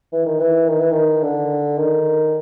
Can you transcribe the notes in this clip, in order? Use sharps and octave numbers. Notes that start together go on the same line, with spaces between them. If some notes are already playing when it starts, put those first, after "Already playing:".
E3
D#3
E3
D#3
E3
D#3
D3
D#3